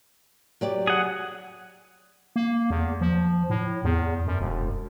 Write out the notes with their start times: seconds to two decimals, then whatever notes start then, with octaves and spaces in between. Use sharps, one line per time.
0.61 F#3 G4 D5
0.87 G#4 F#5
2.36 A#3
2.70 E2
3.01 F3
3.50 A2
3.84 E2
4.27 F#2
4.41 E1